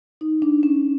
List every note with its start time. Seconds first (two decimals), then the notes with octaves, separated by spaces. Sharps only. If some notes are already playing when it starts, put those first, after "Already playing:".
0.21 D#4
0.42 D4
0.63 C#4